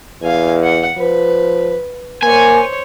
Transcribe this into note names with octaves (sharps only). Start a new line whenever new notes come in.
E2 F5 G#5
F#5
F3 B4
A#3 C5 C#5 G#5